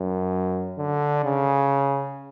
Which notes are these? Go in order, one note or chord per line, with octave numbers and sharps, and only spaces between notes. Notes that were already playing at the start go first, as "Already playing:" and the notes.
Already playing: F#2
D3
C#3